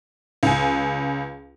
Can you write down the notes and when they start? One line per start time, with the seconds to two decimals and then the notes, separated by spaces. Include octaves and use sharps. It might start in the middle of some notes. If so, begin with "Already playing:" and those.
0.43 C#2 G#5